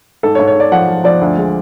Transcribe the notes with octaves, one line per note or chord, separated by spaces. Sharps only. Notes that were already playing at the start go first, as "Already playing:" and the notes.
G#2 A4
C#5
G#2
C#5
G#2 D5
F3 F#5
F3
F3 D5
D2
G#3